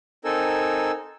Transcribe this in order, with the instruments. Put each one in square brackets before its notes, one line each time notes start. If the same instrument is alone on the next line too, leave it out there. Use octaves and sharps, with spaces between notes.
[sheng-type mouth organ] C4 D#4 A4 A#4 G#5 E6